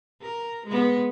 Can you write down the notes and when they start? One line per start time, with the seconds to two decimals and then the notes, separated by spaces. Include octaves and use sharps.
0.22 A#4
0.67 G#3 B3